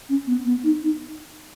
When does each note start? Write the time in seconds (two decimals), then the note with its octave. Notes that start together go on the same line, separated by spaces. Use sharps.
0.09 C#4
0.27 B3
0.46 B3
0.64 D#4
0.83 D#4